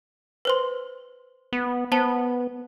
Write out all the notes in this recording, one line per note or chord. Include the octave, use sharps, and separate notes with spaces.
B4 C5 C6
B3
B3 C5 A5